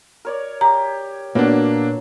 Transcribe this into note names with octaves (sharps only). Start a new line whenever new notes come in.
A#4 C#5 D5
G4 A#5
A#2 F#3 A#3 B3 D4